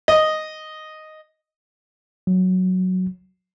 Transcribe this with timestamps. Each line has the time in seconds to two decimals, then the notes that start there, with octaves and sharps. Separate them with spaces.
0.08 D#5
2.27 F#3